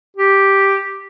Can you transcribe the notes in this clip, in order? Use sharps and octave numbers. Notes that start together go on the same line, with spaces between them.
G4